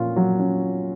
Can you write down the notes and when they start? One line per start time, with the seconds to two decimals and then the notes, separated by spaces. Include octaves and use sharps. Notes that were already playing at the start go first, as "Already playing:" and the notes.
Already playing: A#2 C#4 F4
0.16 F#3
0.39 C#4